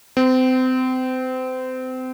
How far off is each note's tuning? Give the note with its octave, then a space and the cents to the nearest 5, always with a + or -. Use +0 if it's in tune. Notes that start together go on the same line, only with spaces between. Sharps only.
C4 -30